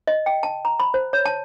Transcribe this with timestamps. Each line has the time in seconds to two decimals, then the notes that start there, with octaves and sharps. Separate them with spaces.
0.07 D#5
0.26 G5
0.43 A5
0.65 A#5
0.80 B5
0.94 C5
1.13 C#5
1.26 A5